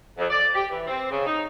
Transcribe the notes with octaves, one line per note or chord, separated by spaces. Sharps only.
F2
D5
G4
E3
C4
C#3
D#4